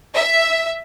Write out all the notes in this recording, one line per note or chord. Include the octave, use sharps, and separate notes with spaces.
E5